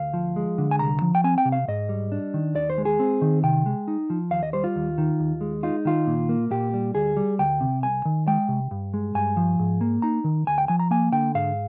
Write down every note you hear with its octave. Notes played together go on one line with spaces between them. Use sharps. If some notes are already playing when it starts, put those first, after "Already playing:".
Already playing: D2 F5
F3
G#3
D3
G#5
C2 A#5
F3
G5
C4 G#5
G5
C3
F5
G#2 D#5
G3
D4
D#3
D#2 D5
C5
G#3
G#4
C4
D#3
C3 G5
G#3
D#4
F3
D#2 F5
D#5
G3 C5
F4
D#2
D#3
D#2
G#3
D#4 F4
D#3 F4
A#2
A#3
A#2 G4
G3
D2 G#4
G3
D2 G5
C3
C2 G#5
D#3
G#3 G5
C3
G2
G#3
G2 G#5
F3
G#2
A#3
D#4 A#5
D#3
D2 G#5
G5
F3 G#5
A#5
A#3 G#5
D3 G5
G#2 F5